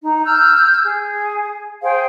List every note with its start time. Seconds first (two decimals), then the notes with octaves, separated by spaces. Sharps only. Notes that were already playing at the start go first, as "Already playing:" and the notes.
0.02 D#4
0.24 E6 F6 G6
0.82 G#4
1.82 G#4 C5 F5 G5